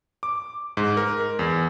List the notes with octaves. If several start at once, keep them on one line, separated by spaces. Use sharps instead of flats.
D6
G#2
A#4
E2